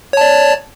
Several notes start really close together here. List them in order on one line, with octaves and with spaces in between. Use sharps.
C#5 A5 D5